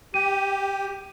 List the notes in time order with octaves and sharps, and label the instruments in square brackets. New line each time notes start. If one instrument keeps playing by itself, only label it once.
[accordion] G4 [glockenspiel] D#7